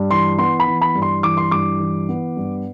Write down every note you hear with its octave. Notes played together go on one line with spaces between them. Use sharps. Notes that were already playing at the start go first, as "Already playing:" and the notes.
Already playing: G2
E3 C6
B3 C6
B5
E3
B5
G2
C6
E3 D6
C6
G2 D6
E3
B3
G2